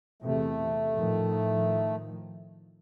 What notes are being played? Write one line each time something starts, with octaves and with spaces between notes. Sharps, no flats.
E2 C3 A3
A2 D#3 F3